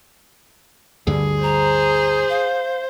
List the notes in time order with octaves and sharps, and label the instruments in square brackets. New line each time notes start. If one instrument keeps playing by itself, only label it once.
[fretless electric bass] D2 G2 D3 [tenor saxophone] G#4
[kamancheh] C5 [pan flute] A#5
[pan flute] F5